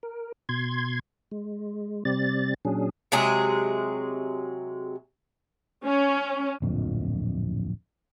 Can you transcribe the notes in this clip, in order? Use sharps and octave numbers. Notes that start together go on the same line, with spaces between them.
A#4
B2 C6 G#6
G#3
C3 G3 C4 D5 A6
A#2 F#3 C#4 D4 G#4
C3 F#3 G#3 G#4
C#4
D1 A#1 F2